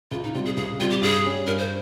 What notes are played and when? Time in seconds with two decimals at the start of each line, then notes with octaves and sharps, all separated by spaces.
0.11 C#2 F4
0.23 D#4
0.34 C3 G3 F4
0.45 G#4
0.57 C#2 G#4
0.79 C3 G3 F4
0.90 G4
1.02 G2 G#4
1.25 G3 C#4
1.47 G2 A#4
1.58 C5